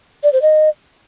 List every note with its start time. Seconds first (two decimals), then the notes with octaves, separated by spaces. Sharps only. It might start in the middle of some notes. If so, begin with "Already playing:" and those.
0.23 D5
0.32 C5
0.42 D#5